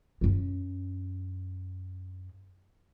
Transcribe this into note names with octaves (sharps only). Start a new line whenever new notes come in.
F#2 C#4